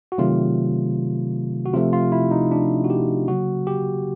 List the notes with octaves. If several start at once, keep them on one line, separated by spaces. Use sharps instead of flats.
F#4
C3 D#3 F#3 A3 F4
F#4
C3 F3 A3 F4
F4
E4
D#4
D4
F#4
G4
C#3 F#3 A#3 F#4
G4